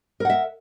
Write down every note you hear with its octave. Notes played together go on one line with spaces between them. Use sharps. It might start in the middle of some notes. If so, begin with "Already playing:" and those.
A#4 E5 F#5